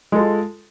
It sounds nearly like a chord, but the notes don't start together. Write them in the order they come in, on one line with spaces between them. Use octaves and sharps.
G#3 A4 F4